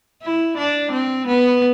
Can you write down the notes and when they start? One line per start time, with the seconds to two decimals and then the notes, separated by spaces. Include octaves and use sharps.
0.23 E4
0.57 D4
0.92 C4
1.28 B3